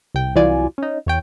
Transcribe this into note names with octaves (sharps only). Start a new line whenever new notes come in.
C2 G5
C2 E3 F#3 F4 D5 G#5
C#4 D#4
E2 C#5 G5